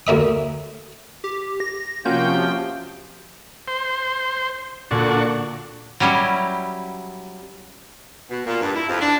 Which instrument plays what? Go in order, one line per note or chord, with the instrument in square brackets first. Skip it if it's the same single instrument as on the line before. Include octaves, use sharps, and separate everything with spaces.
[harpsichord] D2 A#3 E5 D#6
[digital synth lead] G4
A#6
[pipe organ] C3 F3 G5 [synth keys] A#3 C#4 F#4 [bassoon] F4 [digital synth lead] G6
[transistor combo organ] C5
[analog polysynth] A#2 D3 [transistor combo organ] D4 F#4
[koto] F#3 G3 C#4 E4
[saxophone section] B2
A#2
G2
E4
F2
D4